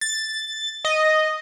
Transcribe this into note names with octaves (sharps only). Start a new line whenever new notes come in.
A6
D#5